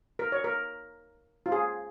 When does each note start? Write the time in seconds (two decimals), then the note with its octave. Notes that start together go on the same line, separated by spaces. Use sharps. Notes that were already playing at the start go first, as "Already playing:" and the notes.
0.19 A#4
0.32 C#5
0.44 A#4
1.46 F4
1.52 G#4